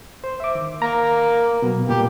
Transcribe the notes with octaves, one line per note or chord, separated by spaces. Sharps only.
C5
E5 D6
D#3
A#3 A#5
B2 F#3 B3
A#2 G3 A#3 G4